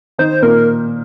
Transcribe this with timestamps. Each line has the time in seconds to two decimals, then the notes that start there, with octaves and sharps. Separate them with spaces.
0.18 D#3 D#4 C5
0.42 A#2 A#3 A#4